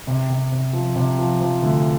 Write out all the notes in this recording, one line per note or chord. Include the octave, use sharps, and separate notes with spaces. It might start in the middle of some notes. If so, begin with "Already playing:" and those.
C3
C3
C3
F3
C3
F3
F3
D2